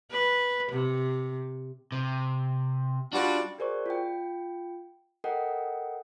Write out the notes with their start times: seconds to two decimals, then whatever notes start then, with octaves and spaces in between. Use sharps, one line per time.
0.11 B4
0.72 C3
1.92 C3
3.13 G3 D4 F4 F#4
3.58 F#4 G#4 A#4 C5 D5 C#6
3.86 F4 G5
5.24 A4 A#4 D#5 F#5 G5